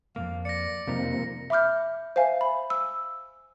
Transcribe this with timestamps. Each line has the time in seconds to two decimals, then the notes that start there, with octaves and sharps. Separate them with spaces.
0.16 F2 G#2 A#3 F5
0.45 D5 A#6 C#7
0.87 F2 C3 F3 G3 A#3 D#4
1.50 E5 B5 D6 F6 G6
2.16 C5 E5 F5 G#5
2.41 B5
2.70 E6